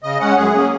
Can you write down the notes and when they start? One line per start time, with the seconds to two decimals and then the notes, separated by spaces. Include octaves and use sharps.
0.03 C#3 D#5
0.20 G#3 C#4 F#5
0.37 F#2 G#4
0.53 F#3 A#3 C#4